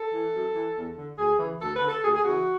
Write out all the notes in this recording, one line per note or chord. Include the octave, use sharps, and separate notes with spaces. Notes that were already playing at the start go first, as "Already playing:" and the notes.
Already playing: A4
E3
F#2
E3
E2
D3
D2 G#4
C#3 E3
D2 A4
B4
D3
A4
D2 G#4
G#4
C#3 E3 F#4